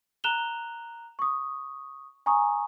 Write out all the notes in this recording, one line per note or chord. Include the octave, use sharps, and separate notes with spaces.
A#5 F#6 E7 F7 G7
C#6 D#6
G#5 A#5 C#6 D#6